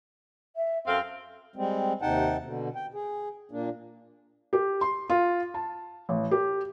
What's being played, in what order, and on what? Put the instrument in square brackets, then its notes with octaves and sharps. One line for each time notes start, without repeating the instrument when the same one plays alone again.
[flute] E5
[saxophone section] F#2 C4 F5 [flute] A4
[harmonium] G3 G#3 C4
D#2 C3 D#4 F#5 G5 A5
B2 D3
G5
G#4
A#2 A#3 D4
[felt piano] G4
C6
F4
A5
A1
G4